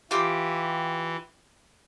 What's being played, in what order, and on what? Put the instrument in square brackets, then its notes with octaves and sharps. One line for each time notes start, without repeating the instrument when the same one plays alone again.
[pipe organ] E3 [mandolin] F4 G4